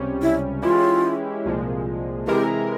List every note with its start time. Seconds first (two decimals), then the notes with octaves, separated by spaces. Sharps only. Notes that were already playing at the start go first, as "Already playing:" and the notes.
Already playing: C#2 C3 G3 C#4
0.22 E4
0.62 E3 G#3 C#4 E4 F4 G4
1.46 C2 A#2 F3 G#3
2.27 C3 E3 G#3 E4 G4 A#4